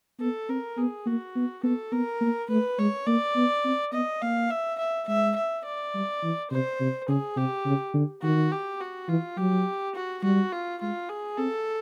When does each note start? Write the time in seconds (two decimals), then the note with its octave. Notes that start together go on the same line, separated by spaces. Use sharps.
0.20 B3 A4
0.49 C4 A#4
0.78 B3 G#4
1.06 A#3 F#4
1.36 B3
1.63 B3 A4
1.92 B3 A#4
2.21 A#3
2.50 A3 B4
2.79 G#3 C#5
3.07 A#3 D5
3.36 B3
3.65 C4
3.93 B3 D#5
4.22 A#3 F5
4.50 E5
4.79 E5
5.08 G#3 E5
5.36 E5
5.66 D5
5.94 G3
6.23 E3
6.51 C3 C5
6.80 C3
7.08 C#3 G#4
7.36 C3 G4
7.66 C#3
7.94 D3
8.23 D#3 F#4
8.52 G4
8.81 F#4
9.09 E3 F4
9.37 F#3 G4
9.95 F#4
10.23 G3 F#4
10.52 F4
10.81 G#3 F4
11.09 G#4
11.38 C4 A4